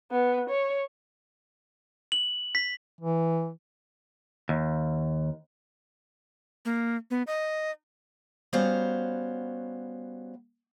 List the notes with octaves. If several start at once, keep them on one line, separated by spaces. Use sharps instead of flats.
B3
C#5
F#7
B6
E3
D#2
A#3
B3
D#5
G3 B3 C#4 F#4 C5 F5